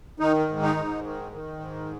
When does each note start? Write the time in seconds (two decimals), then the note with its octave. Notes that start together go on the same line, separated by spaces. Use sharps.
0.20 D#3 D#4
0.49 G#2
0.62 D#4
0.76 G#2
1.04 D#3
1.32 D#3
1.60 G#2